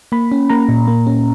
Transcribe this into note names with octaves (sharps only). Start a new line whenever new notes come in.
A#3 B5
C#4
A#3 A#5
A#2
A#3
C#4